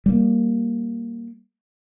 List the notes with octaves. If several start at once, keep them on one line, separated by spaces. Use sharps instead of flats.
G3 A#3